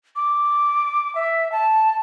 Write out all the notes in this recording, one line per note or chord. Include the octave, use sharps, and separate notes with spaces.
D6
E5
A5